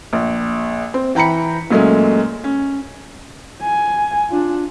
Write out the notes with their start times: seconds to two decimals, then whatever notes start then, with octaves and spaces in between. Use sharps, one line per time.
0.13 A#1
0.94 C4
1.15 E3 G5 A#5 B5 C#7
1.71 A#2 F#3 G#3 A3 C#4
2.44 C#4
3.62 G#5
4.30 D4 F4